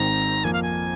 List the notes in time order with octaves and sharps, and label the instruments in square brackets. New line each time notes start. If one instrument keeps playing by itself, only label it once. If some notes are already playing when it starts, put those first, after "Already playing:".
Already playing: [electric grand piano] G#1 G#2 D#3 C4 [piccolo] A#5
[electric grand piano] F2 F3 A#3 [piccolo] G#5
[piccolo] F5
G#5